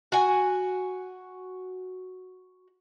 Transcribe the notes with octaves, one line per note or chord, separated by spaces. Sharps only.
F#4 G#5